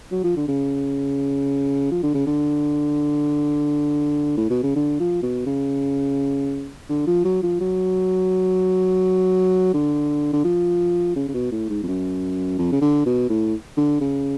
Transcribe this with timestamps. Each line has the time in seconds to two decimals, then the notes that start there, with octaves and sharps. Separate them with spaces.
0.11 F#3
0.24 F3
0.37 D3
0.48 C#3
1.92 F3
2.03 D3
2.14 C#3
2.27 D3
4.37 A2
4.50 B2
4.63 C#3
4.76 D3
5.00 F3
5.23 B2
5.46 C#3
6.89 D3
7.07 F3
7.25 F#3
7.43 F3
7.60 F#3
9.74 D3
10.33 D3
10.44 F3
11.16 C#3
11.28 C#3
11.34 B2
11.51 A2
11.70 G#2
11.83 F2
11.87 F#2
12.59 F2
12.72 C#3
12.82 D3
13.06 B2
13.29 A2
13.77 D3
14.01 C#3